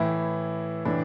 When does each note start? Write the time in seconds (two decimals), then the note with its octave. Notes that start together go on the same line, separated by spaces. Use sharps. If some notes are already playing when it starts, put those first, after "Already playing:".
Already playing: A2 E3 E4
0.85 A2 E3 D4